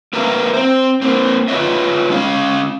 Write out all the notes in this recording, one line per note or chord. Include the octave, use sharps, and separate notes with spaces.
A#3 A#4 B4 E5 F5 A#5
C4 C5
A#3 C4
F4 G4 B4 C#5 D#5 E5
G#3 C#4 F5